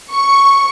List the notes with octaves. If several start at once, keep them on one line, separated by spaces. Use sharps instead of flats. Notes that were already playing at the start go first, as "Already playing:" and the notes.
C#6